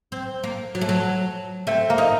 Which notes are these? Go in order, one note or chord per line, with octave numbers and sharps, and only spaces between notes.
C4
A#3
F#3
A3
F#3
A3 C4
A#3
D#4